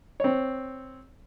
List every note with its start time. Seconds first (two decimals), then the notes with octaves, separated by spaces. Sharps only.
0.20 C4 C#5